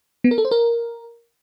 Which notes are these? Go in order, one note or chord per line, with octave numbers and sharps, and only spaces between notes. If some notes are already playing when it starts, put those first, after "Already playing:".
B3
A#4
A4
C5
A#4